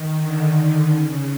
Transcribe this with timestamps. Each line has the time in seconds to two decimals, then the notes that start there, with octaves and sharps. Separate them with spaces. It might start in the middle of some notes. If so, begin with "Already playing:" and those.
Already playing: D#3
0.19 D3
0.91 C#3